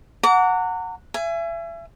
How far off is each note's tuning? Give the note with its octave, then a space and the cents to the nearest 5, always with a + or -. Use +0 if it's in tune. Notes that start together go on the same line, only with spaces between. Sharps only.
F#5 -10 A#5 -35 D6 -40
E5 +35 G#5 +0